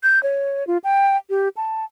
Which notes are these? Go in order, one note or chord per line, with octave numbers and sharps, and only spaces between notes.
G6
C#5
F4
G5
G4
A5